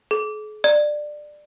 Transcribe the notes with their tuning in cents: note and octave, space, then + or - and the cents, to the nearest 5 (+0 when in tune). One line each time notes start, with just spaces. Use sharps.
G#4 +45
D5 +20